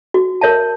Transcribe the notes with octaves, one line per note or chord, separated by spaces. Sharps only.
F#4
A#4 C#5 E5 A5